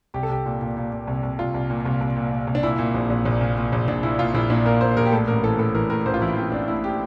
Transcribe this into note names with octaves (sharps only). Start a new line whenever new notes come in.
C2 G4
A4
C2 G4
A#2
A#2
A#2
A#2
C2
C2
C2 F4
C2
A#2
C2
C2
A#2
A#2
C2
D4
A#2 E4
A#2
A#1
A#1
A#1
A#2
A#2
A#1
A#1 D4
A#2 E4
A#2 F4
A#1 E4
A#2 D4
A#2 A#4
A#2 C5
A#1 A#4
G4
A2 A4
A1 A#4
E3 A4
A2 A4
E3 A#4
A2 A#4
A1 C5
F4
E3 E4
E3 C4
A1 D4
A2 E4
G4